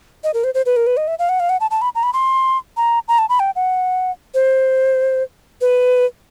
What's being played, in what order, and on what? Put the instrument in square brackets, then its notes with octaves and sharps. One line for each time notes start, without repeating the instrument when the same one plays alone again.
[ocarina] D#5
A#4
C5
C5
B4
A#4
B4
D#5
E5
F5
F#5
F5
F#5
A5
A5
B5
A#5
B5
C6
A#5
A#5
A5
B5
G5
F#5
C5
B4